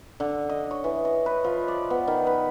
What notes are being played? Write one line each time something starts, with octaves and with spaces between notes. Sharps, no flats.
D3
D#5
C#5
E3
D#5
B4
F3
D5
B3
D#3
B4